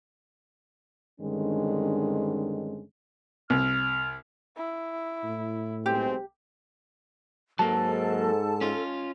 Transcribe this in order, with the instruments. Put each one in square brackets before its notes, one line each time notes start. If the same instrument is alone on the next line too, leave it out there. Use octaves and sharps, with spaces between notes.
[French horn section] G2 D3 D#3 G#3 C4 C#4
[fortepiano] C2 [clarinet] F6
[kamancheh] E4
[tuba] A2
[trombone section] B1 G#3 C4 [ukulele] G4
[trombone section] G#2 [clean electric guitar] F#3 A#3 [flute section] A4 [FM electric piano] A5
[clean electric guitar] C#4 F4